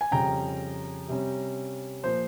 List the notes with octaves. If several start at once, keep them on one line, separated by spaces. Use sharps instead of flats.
G#5
F2 C#3 G3 C#4 G5 A#5
C3 G3 C#4
A#2 F3 C5